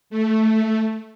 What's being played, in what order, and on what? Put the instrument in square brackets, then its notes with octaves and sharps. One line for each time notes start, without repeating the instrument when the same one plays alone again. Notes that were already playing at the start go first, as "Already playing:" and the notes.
[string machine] A3